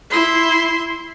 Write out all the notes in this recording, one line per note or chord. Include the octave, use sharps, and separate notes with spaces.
E4 C6